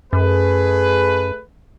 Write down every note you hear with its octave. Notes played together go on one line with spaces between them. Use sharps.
F#2 A3 G#4 B4